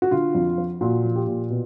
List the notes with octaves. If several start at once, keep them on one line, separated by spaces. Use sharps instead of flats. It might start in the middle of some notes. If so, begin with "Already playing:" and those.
F#4
D3 F4
F2
F3
A#2 F#4
F3
G4
A#2
B2